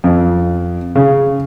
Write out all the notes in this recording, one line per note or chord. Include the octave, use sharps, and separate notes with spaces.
F2
C#3